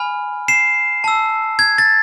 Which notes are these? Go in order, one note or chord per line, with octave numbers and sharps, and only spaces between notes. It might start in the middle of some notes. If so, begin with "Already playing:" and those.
Already playing: G#5 B5 F6
C7 E7
A5 E6
G#6
A6